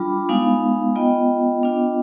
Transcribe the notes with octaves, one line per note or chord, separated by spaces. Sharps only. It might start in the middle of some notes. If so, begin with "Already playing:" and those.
Already playing: G3 D4 F4 B5 D6
G#3 B3 D#4 F5 G#5
B3 F4 D#5 G5
B3 D4 F4